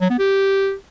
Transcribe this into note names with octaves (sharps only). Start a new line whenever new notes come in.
F#3
B3
G4